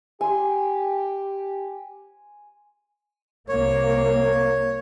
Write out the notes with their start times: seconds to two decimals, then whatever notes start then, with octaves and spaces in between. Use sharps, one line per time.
0.21 G4 G#5 C6
3.49 C2 A#3 C#5